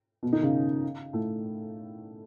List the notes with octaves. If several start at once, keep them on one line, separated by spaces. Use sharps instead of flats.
B2 B3
D#3 D#4
C#3 C#4
A2 A3